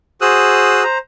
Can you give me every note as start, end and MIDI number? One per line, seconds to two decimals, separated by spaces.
0.21 0.83 66
0.21 0.83 68
0.21 0.83 72
0.21 0.83 87
0.21 0.83 88
0.21 0.83 90
0.84 0.98 72
0.84 0.98 82